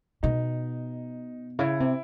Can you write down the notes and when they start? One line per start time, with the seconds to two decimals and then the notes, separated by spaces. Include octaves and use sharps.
0.23 B2 D#4
1.59 C#3 E4
1.80 C3